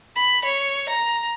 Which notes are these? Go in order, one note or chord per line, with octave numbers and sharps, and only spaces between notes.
B5
C#5
A#5